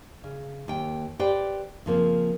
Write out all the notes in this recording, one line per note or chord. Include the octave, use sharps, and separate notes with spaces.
C#3
D#2 G5
G4 B4 C5 D5 G5
C#3 F3 A#3 C4